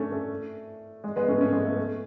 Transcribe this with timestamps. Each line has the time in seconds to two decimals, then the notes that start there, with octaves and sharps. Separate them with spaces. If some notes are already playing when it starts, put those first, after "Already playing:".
Already playing: A3 C#4 D4
0.12 A3
1.04 G#3
1.16 G#3 B3
1.28 A3 C#4
1.40 A3 C#4
1.52 G#3 B3
1.65 A3
1.77 A3